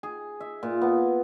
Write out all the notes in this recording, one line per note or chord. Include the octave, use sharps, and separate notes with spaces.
G#4
E5
A#2
B3